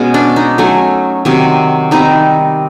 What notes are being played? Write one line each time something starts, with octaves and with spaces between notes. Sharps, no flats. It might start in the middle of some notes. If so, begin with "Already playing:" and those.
Already playing: B2 G#3 C#4
D4
D#4
F#3 A3 C#4
C3 D#3 F#3
D#3 G3 C4 D#4